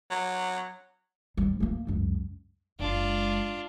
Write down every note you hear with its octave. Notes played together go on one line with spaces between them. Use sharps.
F#3
G3 C4
A3 A#3
C#2 F#2
F#1 G#3 D4 F4